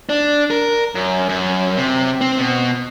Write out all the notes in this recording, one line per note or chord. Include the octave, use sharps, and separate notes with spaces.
D4
A#4
F#2
F#2
C3
C4
B2